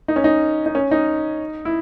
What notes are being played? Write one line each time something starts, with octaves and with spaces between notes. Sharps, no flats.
D#4
C#4
D#4
D#4
C#4
D#4
E4